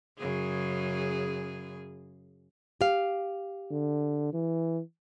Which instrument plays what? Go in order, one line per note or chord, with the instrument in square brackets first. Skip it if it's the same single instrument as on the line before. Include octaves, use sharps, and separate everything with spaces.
[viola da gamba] F#2 C#3 G#4
[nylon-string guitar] G4 F5
[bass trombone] D3
E3